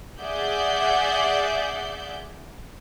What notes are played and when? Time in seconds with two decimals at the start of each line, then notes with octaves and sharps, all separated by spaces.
0.22 G#4 D5 E5 F#5 G6